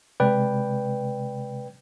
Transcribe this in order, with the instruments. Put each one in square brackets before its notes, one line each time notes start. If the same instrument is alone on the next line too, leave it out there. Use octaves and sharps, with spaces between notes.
[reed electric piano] C3 G#3 [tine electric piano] B4 D5 G5